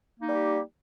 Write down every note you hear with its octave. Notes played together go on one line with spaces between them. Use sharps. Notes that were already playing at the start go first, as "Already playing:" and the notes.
G3 A#3 D#4 G4